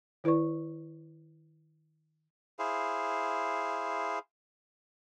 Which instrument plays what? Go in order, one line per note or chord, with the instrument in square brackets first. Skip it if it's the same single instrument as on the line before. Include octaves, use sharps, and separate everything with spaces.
[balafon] D#3 E4 B4 D5 C#6
[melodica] E4 G#4 C5 F5